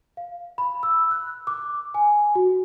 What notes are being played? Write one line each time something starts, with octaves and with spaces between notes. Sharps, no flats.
F5
B5
E6
F#6
D6
G#5
F#4